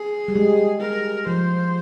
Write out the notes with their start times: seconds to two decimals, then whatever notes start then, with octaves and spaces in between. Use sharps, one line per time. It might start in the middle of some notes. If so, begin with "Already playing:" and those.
Already playing: G#4
0.28 G3
0.35 G#3
0.81 A#4
1.27 F3 C5